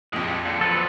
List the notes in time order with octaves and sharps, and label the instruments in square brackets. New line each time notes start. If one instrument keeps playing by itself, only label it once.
[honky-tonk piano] A#1 F2 [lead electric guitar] G#3 G4
[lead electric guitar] A#2 D3
[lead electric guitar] F3 F#3 [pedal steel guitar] A4 B4